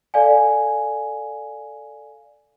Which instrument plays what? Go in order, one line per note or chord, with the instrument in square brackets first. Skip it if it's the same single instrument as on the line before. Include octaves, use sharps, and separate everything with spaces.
[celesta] A4 D5 F5 G#5